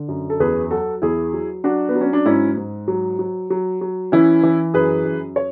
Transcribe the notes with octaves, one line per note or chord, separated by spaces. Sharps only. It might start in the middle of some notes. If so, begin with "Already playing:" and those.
Already playing: D3
F#2
A4
E2 G#4 B4
F#3 F#4 A4
E2 E4 G#4
F#3
F#3 D4 F#4
B3
F#3
C#4
D4
G#2 C#4 E4
G#2
F#3
F#3
F#3
F#3
E3 C#4 E4
E3
F#2 G#4 B4
F#2
C#5